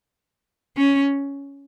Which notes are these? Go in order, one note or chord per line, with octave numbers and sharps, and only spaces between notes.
C#4